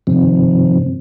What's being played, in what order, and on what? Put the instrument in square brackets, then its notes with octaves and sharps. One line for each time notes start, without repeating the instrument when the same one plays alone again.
[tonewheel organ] G2 C3 D#3 F3 C4